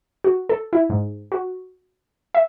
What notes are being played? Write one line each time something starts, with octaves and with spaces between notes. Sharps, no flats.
F#4
A4
E4
G#2
F#4
E5